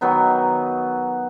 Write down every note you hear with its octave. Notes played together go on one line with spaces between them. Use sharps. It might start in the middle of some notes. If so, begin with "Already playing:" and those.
D#3 F#3 B3 D#4